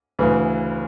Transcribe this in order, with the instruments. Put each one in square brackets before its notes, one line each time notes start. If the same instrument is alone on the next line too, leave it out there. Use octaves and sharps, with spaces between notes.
[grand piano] D2 C#3 E3 B4